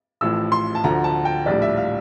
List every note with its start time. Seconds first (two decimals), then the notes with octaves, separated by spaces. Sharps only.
0.21 A1 A2 F3 E6
0.52 C6
0.75 A5
0.84 D2 D3 F3 A#5
1.04 A5
1.25 G5
1.46 A#1 A2 G3 D5
1.62 E5
1.77 F5